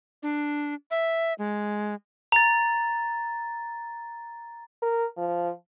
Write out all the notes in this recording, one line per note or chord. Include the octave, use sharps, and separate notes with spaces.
D4
E5
G#3
A#5 A6
A#4
F3